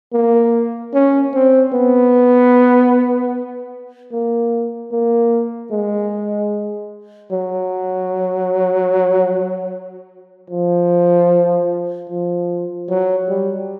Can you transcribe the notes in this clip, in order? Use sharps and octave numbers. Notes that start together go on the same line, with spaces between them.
A#3
C#4
C4
B3
A#3
A#3
G#3
F#3
F3
F3
F#3
G3